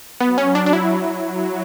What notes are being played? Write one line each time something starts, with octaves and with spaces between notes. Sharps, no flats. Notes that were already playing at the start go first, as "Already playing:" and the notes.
F#3 B3
C#4
D4
D4
E4
F#3